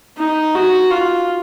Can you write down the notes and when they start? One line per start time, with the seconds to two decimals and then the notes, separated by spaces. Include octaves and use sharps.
0.18 D#4
0.55 F#4
0.91 F4